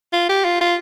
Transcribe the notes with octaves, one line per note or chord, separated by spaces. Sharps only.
F4
G4
F4
F4